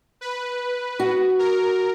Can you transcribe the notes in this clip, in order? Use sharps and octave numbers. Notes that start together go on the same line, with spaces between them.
B4
F#4
A#4